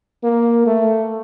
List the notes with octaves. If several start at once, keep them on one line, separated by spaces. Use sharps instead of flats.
A#3
A3